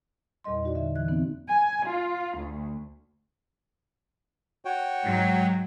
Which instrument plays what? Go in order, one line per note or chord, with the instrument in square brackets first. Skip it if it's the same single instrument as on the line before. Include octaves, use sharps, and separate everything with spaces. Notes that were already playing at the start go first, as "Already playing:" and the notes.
[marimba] E2 A#2 G3 D#5 C6
D#4 F#4 D5
D3 E5
E3 F#6
E3 B3 C4 D#4
[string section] G#5
F4
D2
[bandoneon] F#4 C#5 G5
[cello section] G#2 F#3